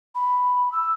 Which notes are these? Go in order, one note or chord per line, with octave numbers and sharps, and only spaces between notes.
B5
E6